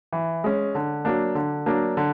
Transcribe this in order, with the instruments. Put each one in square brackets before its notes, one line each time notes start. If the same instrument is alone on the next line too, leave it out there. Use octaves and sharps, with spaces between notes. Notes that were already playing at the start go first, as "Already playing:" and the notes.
[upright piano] E3
G#3 C#4
D3
F#3 A#3 D4
D3
F#3 A#3 D4
D3